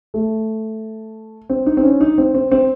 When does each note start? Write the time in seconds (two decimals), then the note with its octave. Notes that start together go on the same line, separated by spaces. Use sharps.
0.14 A3
1.50 C4
1.66 D#4
1.77 C4
1.83 C#4
2.01 D#4
2.18 C4
2.35 C4
2.52 C4